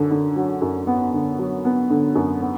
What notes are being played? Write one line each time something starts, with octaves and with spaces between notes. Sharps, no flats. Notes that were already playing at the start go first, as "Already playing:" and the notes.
Already playing: F#2 D3
D3
F#3
F#2
B3
D3
F#3
B3
D3
F#2
B3